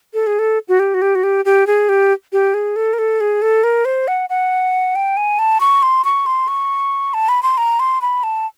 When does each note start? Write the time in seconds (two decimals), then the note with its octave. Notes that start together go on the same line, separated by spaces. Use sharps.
0.14 A4
0.27 G#4
0.39 A4
0.68 F#4
0.79 G4
0.94 F#4
1.02 G4
1.15 F#4
1.24 G4
1.45 G4
1.67 G#4
1.89 G4
2.33 G4
2.54 G#4
2.76 A4
2.93 A#4
2.99 A4
3.21 G#4
3.42 A4
3.64 A#4
3.85 C5
4.08 F#5
4.30 F#5
4.96 G5
5.17 G#5
5.39 A5
5.60 C#6
5.83 C6
6.05 C#6
6.26 C6
6.48 C#6
7.14 A5
7.29 B5
7.43 C6
7.58 A#5
7.80 C6
8.01 B5
8.23 A5